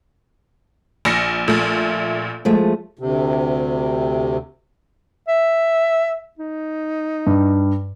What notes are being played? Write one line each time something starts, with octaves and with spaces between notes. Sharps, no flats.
A#1 A#6 C#7
A#1 A#2 A3
F3 G#3 A3
D2 C3
E5
D#4
G2